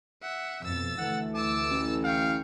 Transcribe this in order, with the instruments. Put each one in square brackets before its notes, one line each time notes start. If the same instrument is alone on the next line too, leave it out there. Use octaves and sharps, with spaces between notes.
[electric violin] E5 F#5
[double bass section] F2 B2 [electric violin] E6 A6
[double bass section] D2 E3 A3 [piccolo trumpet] F#5
[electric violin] A5 E6 [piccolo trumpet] D6
[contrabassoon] A1
[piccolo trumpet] F5 [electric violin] G5 C#6